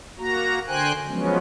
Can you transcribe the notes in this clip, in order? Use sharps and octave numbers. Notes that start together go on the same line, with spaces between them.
A#3 F#4 A#5
D3 C5 G5 G#5 F#6
F3 F#3 G#3 B3 C#4